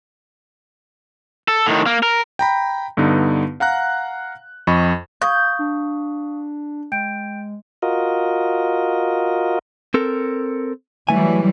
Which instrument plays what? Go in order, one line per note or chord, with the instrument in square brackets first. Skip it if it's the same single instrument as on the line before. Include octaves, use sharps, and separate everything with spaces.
[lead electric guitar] A4
A2 D#3
A#3
A#4
[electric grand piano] G5 A#5 B5
G2 D3 B3 D#4
F5 F#5 A#5 F#6
F2 D#5 B5 C#6
[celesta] F5 C#6 D#6 [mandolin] G6 [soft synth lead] G#6
[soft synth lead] D4
[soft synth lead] G#3 [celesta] G5 G6 D7
[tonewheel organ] F4 F#4 A#4 D#5
[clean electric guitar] C4 A4 A#4
[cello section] E3 F#3 G3 [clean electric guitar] A3 G#5